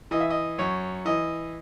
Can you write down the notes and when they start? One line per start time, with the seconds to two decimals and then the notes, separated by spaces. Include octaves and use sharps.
0.11 E3 D#5
0.20 E5
0.30 D#5
0.58 F#2 C#5
1.05 E3 D#5